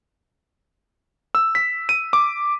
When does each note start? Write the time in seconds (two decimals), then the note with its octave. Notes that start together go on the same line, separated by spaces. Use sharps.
1.35 E6
1.55 B6
1.89 D#7
2.13 D6